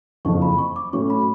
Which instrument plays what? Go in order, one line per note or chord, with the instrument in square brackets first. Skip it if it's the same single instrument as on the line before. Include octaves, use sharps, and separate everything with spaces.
[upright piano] F#1 F2 F3 [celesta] C#6
[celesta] B5
C#6
D6
[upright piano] A2 F#3 C#4 [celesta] C#6
[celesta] B5